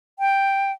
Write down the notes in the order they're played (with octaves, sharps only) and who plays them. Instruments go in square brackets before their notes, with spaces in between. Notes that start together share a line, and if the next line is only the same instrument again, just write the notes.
[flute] G5